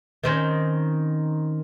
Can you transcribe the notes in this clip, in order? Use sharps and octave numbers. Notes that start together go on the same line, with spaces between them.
D#3 C4 C#4